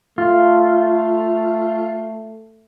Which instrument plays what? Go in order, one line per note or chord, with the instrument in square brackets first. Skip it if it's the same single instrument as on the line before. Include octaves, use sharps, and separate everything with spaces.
[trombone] A3 [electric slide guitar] F4